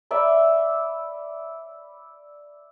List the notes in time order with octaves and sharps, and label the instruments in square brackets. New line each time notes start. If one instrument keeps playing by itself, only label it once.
[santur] D5 E5 B5